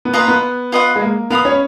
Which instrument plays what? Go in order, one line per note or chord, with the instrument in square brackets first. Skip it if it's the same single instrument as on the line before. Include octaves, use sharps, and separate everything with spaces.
[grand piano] B3
[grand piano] A#3 [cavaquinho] F4 B4 D#5 A#5
[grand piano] B3
[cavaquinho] F4 B4 D#5 F#5
[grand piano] G#3
A#3
[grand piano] B3 [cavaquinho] A#4 F5 B5 D#6
[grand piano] C#4